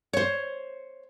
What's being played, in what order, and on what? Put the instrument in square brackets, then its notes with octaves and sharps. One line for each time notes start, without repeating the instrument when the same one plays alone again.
[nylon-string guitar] C5 C#5